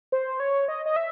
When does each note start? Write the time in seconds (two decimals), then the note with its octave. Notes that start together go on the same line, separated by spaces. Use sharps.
0.12 C5
0.40 C#5
0.68 D#5
0.86 D#5
0.96 E5